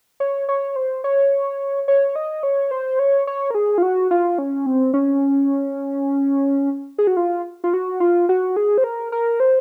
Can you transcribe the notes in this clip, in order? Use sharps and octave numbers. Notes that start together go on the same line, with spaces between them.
C#5
C#5
C5
C#5
C#5
D#5
C#5
C5
C#5
C#5
A#4
G#4
F4
F#4
F4
C#4
C4
C#4
G#4
F#4
F4
F4
F#4
F4
F#4
G#4
C5
A#4
A#4
C5